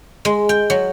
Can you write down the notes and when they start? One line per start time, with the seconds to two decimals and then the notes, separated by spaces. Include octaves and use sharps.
0.25 G#3
0.49 G5
0.70 F#3